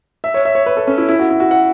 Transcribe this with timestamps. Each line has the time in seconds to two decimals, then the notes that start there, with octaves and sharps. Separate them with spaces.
0.24 E5
0.34 C#5
0.45 E5
0.55 C#5
0.66 B4
0.77 A4
0.87 C#4
0.98 E4
1.09 E4
1.19 F#4
1.30 E4
1.40 F#4
1.51 F#5